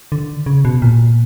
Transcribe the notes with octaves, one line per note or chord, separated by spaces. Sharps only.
D3
C#3
B2
A#2